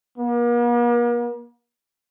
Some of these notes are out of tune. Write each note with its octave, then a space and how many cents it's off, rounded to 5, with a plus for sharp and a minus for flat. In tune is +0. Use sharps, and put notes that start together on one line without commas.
A#3 +45